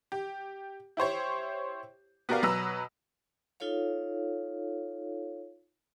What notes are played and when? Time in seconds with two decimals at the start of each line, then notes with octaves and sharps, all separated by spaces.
0.12 G4
0.97 E4 G4 C5 C#5
2.29 B3 F#4 G4 A#4 D5 F5
2.42 B2 F#3 B4 A#5 E6
3.60 D#4 F4 A4 C#5 F5